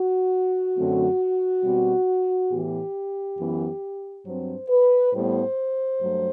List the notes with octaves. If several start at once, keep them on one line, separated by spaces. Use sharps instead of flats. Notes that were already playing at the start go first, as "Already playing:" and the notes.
Already playing: F#4
F#2 D3 F#3 A3 C4
B2 G3 C4
A2 E3 B3 G4
F#2 E3 B3
G2 F#3 C4 C5
B4
A2 G3 B3 C5
G2 F#3 A3